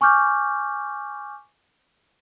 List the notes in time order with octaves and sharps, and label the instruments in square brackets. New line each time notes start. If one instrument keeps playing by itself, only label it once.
[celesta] G#5 C#6 D6 F6 G6